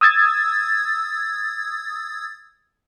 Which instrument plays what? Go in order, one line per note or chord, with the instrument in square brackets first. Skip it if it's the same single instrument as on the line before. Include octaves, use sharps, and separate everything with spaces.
[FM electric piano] D#6 E6 G#6 A6